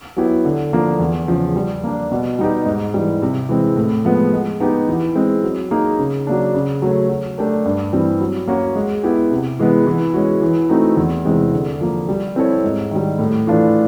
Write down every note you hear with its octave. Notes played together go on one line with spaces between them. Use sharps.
F#3 B3 E4 G4
D3
F3 A#3 D4
E2
C#3 F3
G3
A#3 D4
B2
G3 B3 D#4 G4
G#2
E3 G3
C3
E3 G#3 C4
A2
F3 G#3 B3
G#3
B3 D#4 G4
E3
G#3 C4
F#3
A#3 D#4 G#4
C#3
F#3 A#3 D4
C#3
F#3 A3 C#4
F#3
A3 D4 G4 A#4
G2
E3 G3 C4
F#3
A#3 C#4 F#4
G#3
B3 E4 G4
C3
E3 G#3 B3
E3
G#3 C#4 F#4
E3
A3 C4 D#4 F#4
E2
C3 E3 G#3 C4
D3
F3 A#3
G3
C4 E4 A4 C#5
G#2
D#3 G3
A2
E3 A3 D4 F4